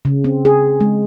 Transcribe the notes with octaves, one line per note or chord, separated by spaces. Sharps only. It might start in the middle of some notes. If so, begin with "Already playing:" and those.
C#3
C4
G#4
G#3